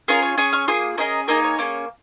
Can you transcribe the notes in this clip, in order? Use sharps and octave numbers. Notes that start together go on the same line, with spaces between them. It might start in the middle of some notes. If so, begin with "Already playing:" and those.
C#4 F4 G#4 A#4
C#5
C#4 G#4 G#5 C#6
C#6 F6
A#3 F4 G#4 D#6
C#4 G#4 A#4 D#5
A#3 D#4 G#4 A#4 D#5
C#5
A#3 C#4 G#4